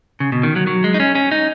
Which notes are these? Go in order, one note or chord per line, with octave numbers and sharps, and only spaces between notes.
C#3
B2
D#3
F#3
F#3
G#3
D#4
C#4
C#4
D#4